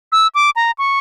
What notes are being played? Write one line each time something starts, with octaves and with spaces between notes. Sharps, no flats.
E6
D6
A#5
C#6